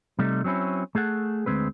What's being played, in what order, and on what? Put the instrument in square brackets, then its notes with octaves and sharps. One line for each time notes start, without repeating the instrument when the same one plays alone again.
[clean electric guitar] C3 G3 A3 D#4
F#3 C4 C#4 E4
A3 G#4 A4 F#5
D2 G#3 C4 B4